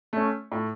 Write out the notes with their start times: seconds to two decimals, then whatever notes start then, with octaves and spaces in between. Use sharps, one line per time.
0.13 A3 C#4
0.52 A2